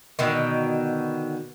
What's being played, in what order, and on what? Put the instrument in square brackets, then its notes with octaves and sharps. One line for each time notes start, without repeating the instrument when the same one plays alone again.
[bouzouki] B2 D3 D#3